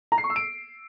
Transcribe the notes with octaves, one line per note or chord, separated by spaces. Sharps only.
A#5
C7
C#6
E6
D7